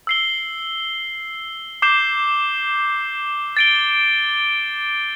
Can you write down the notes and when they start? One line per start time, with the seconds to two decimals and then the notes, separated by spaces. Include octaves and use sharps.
0.07 E6 C7 G7
1.82 D6 G6 C7 E7 G7
3.57 A6 D7 G7